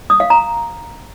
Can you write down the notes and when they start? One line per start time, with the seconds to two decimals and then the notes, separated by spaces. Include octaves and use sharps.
0.10 D#6
0.20 F5
0.30 A#5